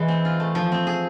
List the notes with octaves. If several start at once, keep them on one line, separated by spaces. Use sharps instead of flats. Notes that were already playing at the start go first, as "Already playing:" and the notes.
Already playing: E3 G#3
C4
F4
A3
F3
C4
G#4